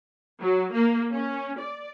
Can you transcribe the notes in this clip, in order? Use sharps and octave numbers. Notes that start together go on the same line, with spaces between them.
F#3
A#3
C#4
D5